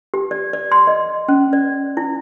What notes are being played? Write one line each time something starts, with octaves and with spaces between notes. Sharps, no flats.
G4
D5
D5
C6
D#5
C#4
D5
E4